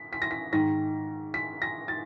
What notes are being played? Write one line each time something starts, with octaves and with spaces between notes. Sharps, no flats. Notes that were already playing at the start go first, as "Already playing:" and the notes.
Already playing: B6
B6
A#6
B6
G#2 D#3 A#6
B6
A#6
A6